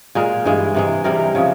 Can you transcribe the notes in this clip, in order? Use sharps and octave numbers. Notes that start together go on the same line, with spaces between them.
A#2 G#3 A#4
G2 E3 G#3
C3 E3 G#3
C3 E3 G3 A#4
A#4
C#3 F3 G#3